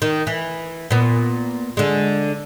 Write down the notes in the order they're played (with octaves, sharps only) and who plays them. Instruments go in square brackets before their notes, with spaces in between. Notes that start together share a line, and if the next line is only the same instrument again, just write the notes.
[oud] D#3
E3
A#2 B3
D3 G#3